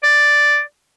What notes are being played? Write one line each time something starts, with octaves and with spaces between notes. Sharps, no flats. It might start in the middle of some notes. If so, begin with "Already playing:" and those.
D5